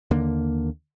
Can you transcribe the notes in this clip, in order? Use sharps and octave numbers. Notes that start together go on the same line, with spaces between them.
D#2 D3 A#3